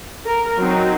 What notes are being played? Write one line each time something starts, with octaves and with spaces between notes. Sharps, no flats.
A#4
F#3 C4 D#4